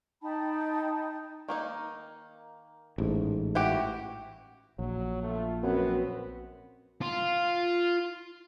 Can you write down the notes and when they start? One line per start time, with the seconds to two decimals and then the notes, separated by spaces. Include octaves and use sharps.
0.22 D#4 G5 A5 B5
1.48 D#3 A#3 D#4
2.98 A1 G#2
3.55 E4 F#4 G4
4.79 A#1 F#3
5.23 A3 F4
5.63 F#2 B3 C4 F#4 B4
7.01 F4